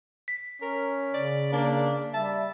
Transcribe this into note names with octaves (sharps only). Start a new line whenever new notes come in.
B6
C#4 A#4
C#3 D5
A#3 D4
G3 E5 A5